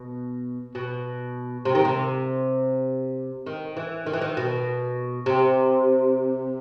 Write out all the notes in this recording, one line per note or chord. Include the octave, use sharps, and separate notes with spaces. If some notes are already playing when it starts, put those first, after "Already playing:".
Already playing: B2
B2
C3
D#3
C3
D#3
E3
D#3
E3
D#3
B2
C3